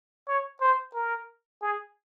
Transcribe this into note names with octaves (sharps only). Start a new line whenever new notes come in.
C#5
C5
A#4
G#4